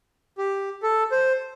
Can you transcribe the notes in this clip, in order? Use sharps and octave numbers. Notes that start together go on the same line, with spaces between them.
G4
A4
C5